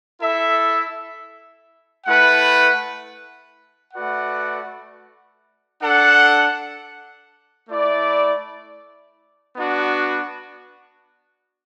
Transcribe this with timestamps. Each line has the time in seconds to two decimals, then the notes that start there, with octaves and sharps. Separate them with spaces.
0.20 E4 A4 E5
2.07 A3 E4 B4 F#5
3.94 A3 F#4 B4 D5 F#5
5.82 D4 A4 F#5
7.69 A3 E4 D5
9.56 B3 D4 F#4